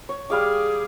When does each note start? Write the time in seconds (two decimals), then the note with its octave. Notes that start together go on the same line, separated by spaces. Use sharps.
0.09 C#5
0.30 G3 G#4 F5 D6